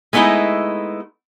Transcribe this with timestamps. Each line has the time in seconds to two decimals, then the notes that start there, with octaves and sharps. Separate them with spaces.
0.13 G#3 A3 B3 D#4 E4